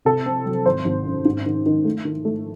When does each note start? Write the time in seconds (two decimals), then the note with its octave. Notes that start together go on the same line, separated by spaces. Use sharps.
0.05 C3 A4
0.26 C4
0.46 F#3
0.65 G#1 C5
0.85 G#1
1.05 F#2
1.25 G#2
1.46 D#3
1.66 D#3
1.85 A3
2.05 D#3
2.25 A3